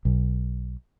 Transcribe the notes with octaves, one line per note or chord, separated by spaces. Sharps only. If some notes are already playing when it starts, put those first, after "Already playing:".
B1